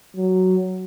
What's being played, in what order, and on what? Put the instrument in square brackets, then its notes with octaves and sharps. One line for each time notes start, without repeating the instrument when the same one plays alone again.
[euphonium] F#3